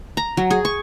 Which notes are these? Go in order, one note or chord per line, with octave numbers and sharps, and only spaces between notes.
A#5
F#3
G#4
C#6